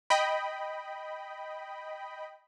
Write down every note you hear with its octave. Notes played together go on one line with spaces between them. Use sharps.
D#5 G5 B5